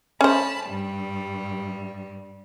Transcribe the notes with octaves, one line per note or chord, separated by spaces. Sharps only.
C#4 C5 A5 B5
G2 G3